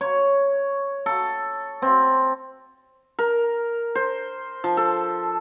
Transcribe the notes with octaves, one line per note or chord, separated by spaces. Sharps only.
C#5
A4
C4
A#4
C5
F3
A4